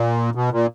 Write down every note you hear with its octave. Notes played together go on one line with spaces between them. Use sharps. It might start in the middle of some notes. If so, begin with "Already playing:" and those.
Already playing: A#2
B2
A#2